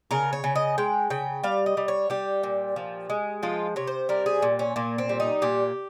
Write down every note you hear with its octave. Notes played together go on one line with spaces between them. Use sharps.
C#3 A#4
C#5
C#3
D#5
G#3 G5
C#3 G5
G3 F5
D#5
G3
C#5
G3 G4
A#2
F3
G#3
F3 F4
C3 C#5
C5
G3 A#4
G#4
A#2
C#4
A#2 A#3
C4
G3
D#4
A#2 G4